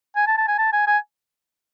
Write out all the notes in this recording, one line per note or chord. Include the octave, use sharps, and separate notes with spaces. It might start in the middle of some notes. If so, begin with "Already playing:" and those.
G#5
A5
A5
G#5
A5
G#5
G#5